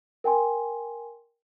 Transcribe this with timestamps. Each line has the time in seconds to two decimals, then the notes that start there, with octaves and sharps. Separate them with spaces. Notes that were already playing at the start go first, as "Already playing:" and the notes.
0.24 A#4 G5 G#5 C6